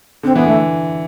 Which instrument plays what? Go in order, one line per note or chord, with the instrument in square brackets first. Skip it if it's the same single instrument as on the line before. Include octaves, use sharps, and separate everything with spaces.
[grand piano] D3 [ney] C4
[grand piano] E3 [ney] B3
[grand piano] D3 [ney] A3